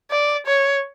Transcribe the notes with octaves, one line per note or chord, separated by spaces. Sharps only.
D5
C#5